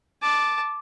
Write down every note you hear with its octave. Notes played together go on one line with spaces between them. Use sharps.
A5 D6